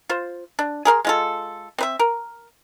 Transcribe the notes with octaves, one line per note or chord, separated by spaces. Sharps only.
F4 C5
D4
G#4 A#4 F5 C6
G#3 F4 A4
C4 B4 E5
A#4